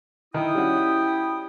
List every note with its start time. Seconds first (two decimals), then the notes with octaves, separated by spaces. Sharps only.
0.34 D#3 E4 G5 D#6
0.55 G3 C#4 F#4